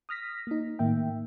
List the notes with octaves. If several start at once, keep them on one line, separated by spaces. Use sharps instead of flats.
D#6 F6 A#6 B6
A#3 D#4
A2 D#3 A#3 E5 G5